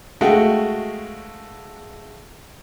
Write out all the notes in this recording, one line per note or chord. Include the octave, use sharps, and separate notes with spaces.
G#3 A3 F#4 D#5 F5 G5